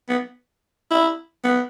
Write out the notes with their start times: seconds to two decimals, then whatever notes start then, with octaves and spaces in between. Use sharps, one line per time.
0.09 B3
0.91 E4
1.44 B3